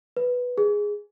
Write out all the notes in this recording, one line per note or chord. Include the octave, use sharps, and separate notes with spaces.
B4
G#4